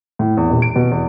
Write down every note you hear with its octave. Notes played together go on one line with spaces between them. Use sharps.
A2
E2
D#1
D7
B2
E2